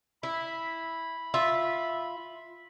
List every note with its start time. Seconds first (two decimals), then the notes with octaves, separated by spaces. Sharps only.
0.23 E4 B5
1.34 F4 E5